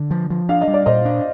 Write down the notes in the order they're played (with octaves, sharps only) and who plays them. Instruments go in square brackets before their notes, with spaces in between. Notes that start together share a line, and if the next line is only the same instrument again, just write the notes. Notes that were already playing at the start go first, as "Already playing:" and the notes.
Already playing: [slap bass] D3
F3
F3
[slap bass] D4 [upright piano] F5
[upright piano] D#5
[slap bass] G3
[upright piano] D5
[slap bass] A#2 [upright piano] C5 D#5
[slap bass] D4